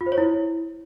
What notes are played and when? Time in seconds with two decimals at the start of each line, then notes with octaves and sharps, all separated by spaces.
0.01 F4
0.06 C5
0.12 C#5
0.18 E4